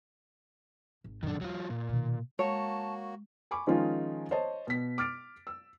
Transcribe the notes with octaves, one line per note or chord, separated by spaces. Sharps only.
G#1
F#2 A#2 D#3 D4
E2 F#3 F4
A#2
B2 D#3
G#3 A#3 F#4 C#5 A5
G#5 B5 C#6 D6
D#3 F3 G#3 C#4 D#4 F4
C5 C#5 D#5 A5
B2 B6
D6 F6 A6 D7
E6